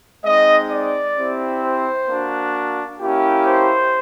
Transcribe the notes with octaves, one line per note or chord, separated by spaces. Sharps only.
G#3 C4 D#4 D#5
D5
C4 E4 G4
C5
A#3 D4 F#4
A#3 C#4 E4 G4
C5